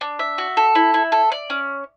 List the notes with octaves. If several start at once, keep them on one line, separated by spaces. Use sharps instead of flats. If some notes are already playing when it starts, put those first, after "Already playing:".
D4
E5
F#4
A4
E4
E4
A4
D5
C#4